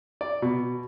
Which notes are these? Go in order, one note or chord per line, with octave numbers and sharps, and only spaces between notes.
D5
B2